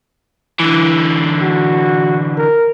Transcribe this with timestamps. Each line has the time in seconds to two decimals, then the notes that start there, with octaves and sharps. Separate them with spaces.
0.59 D3 E3
1.42 F#4
2.38 A#4